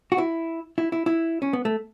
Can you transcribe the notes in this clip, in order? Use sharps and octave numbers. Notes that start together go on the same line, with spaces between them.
F#4
E4
E4
E4
E4
C#4
B3
A3